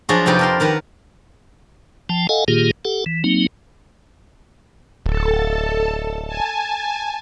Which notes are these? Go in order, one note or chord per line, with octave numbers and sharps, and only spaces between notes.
F3 F#3 D4 F#4 G#4
F2 C3 D#4 G4 B4
D4 A#4 C6
D#3 A#4 B4 F#5
F3 G5 A5
A4 D#5 F5 F#5 G#5
A#2 D#3 A#3 F4 G4 G#4
G4 A4 F#5
E3
F#3 A#3 C4 D#4
D1 A4 A5
G#5 A5